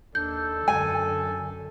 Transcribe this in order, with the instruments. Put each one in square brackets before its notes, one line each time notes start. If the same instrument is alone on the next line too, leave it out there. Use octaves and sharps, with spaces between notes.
[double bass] D#2 D4 [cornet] A4 [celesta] G6
[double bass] F#2 D3 [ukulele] G#5